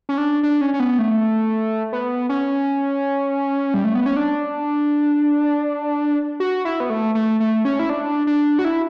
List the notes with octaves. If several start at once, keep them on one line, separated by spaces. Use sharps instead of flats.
C#4
D4
D4
C#4
C#4
B3
A3
B3
C#4
G3
A3
B3
C#4
D4
F#4
E4
B3
A3
A3
A3
C#4
E4
D4
D4
F#4
E4